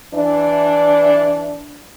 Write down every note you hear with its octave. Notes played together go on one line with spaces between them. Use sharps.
E3 D4